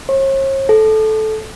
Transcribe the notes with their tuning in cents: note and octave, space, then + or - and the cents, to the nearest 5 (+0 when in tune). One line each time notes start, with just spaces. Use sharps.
C#5 -45
A4 -15